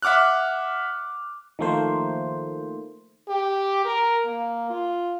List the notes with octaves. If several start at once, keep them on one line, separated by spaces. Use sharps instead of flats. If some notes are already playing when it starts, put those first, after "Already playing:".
E5 F#5 D6 F6 F#6
D#3 F3 A3 A#3 C5
G4
A#4
A#3
F4